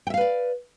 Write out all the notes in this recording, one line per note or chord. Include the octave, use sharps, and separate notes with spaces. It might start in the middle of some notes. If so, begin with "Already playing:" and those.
B4 D5 E5 F5 G5